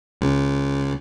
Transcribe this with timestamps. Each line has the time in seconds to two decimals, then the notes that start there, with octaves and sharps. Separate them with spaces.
0.21 C#2